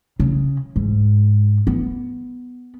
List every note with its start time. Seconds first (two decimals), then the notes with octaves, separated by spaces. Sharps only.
0.20 C#3
0.76 G#2
1.67 B3